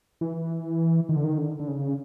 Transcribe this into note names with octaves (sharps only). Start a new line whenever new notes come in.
E3
D#3
D3
D#3
D3
D3
C#3